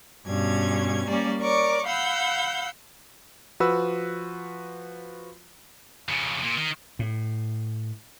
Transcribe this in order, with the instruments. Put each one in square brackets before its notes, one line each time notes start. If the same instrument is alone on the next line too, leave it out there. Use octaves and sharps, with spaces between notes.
[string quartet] G2 B2 C#4 G#6
G3 A#3 C#4 D5
A#4 C#5 D5 C#6 D6
F5 F#5 B5 E6 G6
[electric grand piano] F3 F#4 B4 B5 E6
[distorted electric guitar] F2 C#3
A#2
D#3
[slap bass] A2